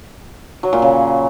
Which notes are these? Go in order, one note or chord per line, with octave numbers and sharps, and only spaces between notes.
F#3
A#2
C#3